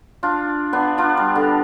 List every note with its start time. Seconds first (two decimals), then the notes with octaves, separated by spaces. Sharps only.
0.23 D4 F4
0.73 B3 D4
0.98 D4 F4
1.17 G3
1.36 D3